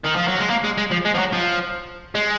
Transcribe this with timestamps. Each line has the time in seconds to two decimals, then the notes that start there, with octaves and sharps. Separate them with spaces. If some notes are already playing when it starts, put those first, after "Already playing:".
0.06 D#3
0.17 F3
0.28 F#3
0.39 G#3
0.50 A#3
0.64 G#3
0.77 G#3
0.91 F3
1.05 G#3
1.15 F3
1.18 F#3
1.33 F3
2.15 G#3